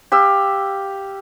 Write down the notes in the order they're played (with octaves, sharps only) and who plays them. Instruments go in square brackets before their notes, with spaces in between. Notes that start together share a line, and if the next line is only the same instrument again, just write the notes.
[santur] G4 F5 E6